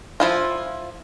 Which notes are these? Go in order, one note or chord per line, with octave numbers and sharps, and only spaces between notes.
F3 E4 F4